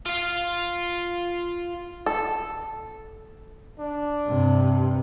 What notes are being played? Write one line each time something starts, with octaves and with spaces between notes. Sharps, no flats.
F4 F5
A4
D4
G2 C3